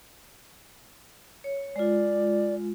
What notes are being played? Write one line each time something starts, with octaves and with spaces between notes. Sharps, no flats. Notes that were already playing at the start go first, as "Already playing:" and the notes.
C#5
G#3 F4 D5